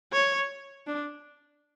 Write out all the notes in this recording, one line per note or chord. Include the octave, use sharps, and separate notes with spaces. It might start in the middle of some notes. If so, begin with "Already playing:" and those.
C#5
D4